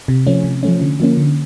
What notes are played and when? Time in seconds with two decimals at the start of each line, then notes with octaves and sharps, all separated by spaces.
0.08 C3
0.27 F3 A3 C#4
0.44 C3
0.63 F3 A3 C#4
0.81 D3
1.00 F3 A#3 C#4
1.17 D3